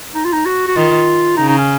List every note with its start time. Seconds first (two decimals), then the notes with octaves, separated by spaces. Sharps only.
0.15 D#4
0.24 F4
0.33 D#4
0.46 F#4
0.68 F#4
0.76 D#3 F4
1.37 C#3 D#4
1.48 D#4
1.58 C#4